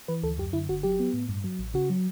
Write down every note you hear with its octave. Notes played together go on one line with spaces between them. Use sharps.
E3 B4
D2 A4
F#2 G4
D3 E4
G1 F#4
F#3 G4
B3
A2
G2
F#3
A1
C#3 F#4
F#3